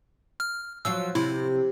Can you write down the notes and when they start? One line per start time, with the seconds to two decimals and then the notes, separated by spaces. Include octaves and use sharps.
0.40 F6
0.85 F3 F#3 F4 E6
1.15 C3 E4